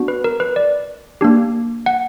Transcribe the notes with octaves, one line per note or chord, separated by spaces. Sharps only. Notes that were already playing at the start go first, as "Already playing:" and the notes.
Already playing: B3 D4 F#4
B4
A#4
B4
D5
A#3 D4 G4
F#5